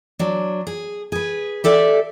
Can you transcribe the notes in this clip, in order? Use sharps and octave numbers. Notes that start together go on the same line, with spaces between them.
F#3 D4
G#4
G#4 B4
G4 A4 D5 E5